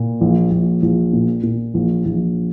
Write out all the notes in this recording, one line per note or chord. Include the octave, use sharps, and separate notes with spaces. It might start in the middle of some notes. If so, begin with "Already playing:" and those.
Already playing: A#2
A#1
A#1
A#1
A#2
A#2
A#1
A#1